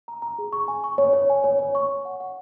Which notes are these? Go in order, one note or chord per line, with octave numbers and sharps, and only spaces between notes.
A#5
A#5
G#4
C#6
G#5
C#6
C#5
C#5
G#5
C#5
C#5
C#6
C#5
F#5
F#5